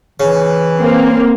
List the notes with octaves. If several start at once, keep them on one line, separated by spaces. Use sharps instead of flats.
C#3 E3
A#3 C4